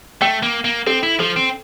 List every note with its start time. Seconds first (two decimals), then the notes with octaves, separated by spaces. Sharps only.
0.21 A3 G5
0.43 A#3
0.65 A#3
0.87 C4 A4
1.03 E4
1.20 F3 A4
1.36 C4